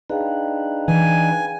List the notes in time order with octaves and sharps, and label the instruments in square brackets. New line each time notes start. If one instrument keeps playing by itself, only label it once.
[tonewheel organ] D4 D#4 B4 [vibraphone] G#4 F5 G5
[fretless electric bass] E3 [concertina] G#5